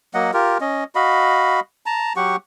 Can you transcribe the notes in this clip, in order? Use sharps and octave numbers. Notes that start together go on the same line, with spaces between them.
F#3 A#3 D#5 F#5
F4 G4 A#4
C#4 D#5
F#4 D#5 F5 B5
A5 A#5
F#3 G4 F#5 C#6